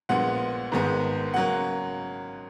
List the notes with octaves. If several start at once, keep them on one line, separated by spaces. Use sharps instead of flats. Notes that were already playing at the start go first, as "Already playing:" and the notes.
A#1 A#2 G#3 B3 F#5
G#1 G#2 D#3 G#3 B3
C#3 F#3 A#3 F#5